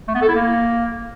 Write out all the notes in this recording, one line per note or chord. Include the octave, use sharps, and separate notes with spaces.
A3
B3
A4
E4
A#3